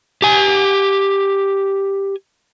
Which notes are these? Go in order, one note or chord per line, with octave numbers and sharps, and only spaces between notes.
G4 G#5